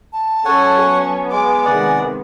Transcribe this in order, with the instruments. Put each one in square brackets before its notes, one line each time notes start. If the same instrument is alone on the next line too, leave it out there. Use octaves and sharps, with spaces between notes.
[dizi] A5
[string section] F#3 C#4 [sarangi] A4 [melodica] C#5 F#5 G#5
[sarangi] B3
[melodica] G#3 [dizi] G#5 [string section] D6
[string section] C3 D#3 G#3 [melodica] D5 F#5